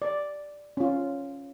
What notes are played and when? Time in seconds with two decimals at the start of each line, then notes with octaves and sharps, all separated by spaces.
0.02 D5
0.77 C#4 F4